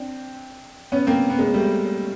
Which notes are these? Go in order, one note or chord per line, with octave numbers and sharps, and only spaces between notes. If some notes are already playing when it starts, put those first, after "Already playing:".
Already playing: C4 D4
B3 C#4
A#3 C4
B3
G#3 A#3
G3 A3